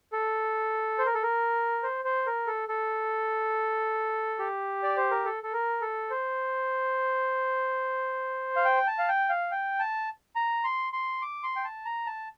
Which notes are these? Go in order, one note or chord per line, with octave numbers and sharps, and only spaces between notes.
A4
C5
A#4
A4
A#4
C5
C5
A#4
A4
A4
G4
D5
C5
A#4
A4
A4
A#4
A4
C5
F5
G5
A5
F5
G5
F5
G5
A5
A#5
C6
C6
D6
C6
G5
A5
A#5
A5